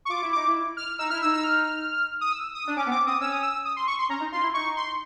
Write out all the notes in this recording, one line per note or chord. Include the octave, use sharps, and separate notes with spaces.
C#6
F4 D6
E4
D#4 D6
E4
F6
D#4 E6
E4 F6
D#4 E6
E6
F6
D#6
E6
D#6
D4
C#4 D6
B3
C4 D6
C4 D#6
C#4 E6
D#6
E6
D#6
C6
C#6
C6
C#4 A#5
D#4
F4 C6
E4
D#4 C#6
C6